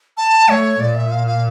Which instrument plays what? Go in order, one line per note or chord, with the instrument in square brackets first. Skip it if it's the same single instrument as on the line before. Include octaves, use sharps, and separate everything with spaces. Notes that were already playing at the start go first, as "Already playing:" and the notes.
[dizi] A5
[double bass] A3 [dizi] C#5
[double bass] A#2 [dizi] D5
[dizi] E5
F5
F5